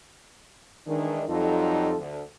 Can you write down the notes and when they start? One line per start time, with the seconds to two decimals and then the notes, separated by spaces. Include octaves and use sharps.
0.87 D#3 E3 G#3 D4
1.29 F2 F#3 G3 D#4 F4 A4
1.98 D2 D3